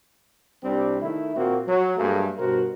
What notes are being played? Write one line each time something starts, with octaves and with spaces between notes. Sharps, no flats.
C2 G3 C4 D4 G4
D#3 A3 E4
A#2 A#3 C4 F#4
F#3
G2 F#3 A3 A#3 G#4
G2 B2 F#4 A#4 C5